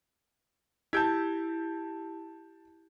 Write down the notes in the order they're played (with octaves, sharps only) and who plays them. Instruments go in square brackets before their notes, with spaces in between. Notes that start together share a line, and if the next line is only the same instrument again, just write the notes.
[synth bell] E4 G4 [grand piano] A5 G6 G#6